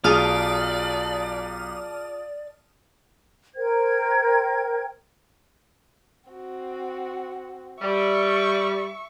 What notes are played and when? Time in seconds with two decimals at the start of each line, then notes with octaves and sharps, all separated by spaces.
0.04 B1 F4 G#4 D5 A5 D#6 F6
3.55 A#4 C5 G5 G#6
6.30 C4 F#4
7.81 G3 E5 C#6